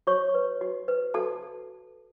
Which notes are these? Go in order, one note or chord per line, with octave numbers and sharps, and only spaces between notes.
F#4 C#5 C#6
B4
F#4
B4
F#4 A4 A5